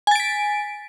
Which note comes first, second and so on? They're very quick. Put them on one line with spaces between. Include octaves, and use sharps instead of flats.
G#5 A6 D7 B6